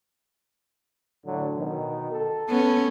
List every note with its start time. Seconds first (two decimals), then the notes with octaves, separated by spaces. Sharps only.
1.26 A2 D3 F#3
1.57 B2 D#3
2.12 A4
2.49 B3 C#4